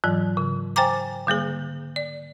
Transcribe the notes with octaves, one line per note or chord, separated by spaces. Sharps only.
G#2 E3 F#3
C#3
C5 G5 G#5 A#5 D6
D3 G3 A#3 G#4
D5